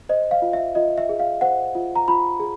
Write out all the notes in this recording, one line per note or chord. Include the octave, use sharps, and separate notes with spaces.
C5 D#5
F5
F4
E5
F4 D#5
E5
G#4
F5
C5 F#5
F4
A#5
F4 B5
G#4